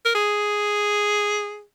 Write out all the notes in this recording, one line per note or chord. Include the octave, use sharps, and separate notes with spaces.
A#4
G#4